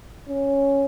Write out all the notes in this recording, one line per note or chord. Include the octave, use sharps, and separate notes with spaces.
C#4